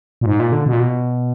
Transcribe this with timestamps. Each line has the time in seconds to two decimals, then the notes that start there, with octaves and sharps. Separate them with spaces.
0.21 A#2
0.26 G#2
0.40 A#2
0.52 D3
0.66 B2
0.73 A#2
0.80 B2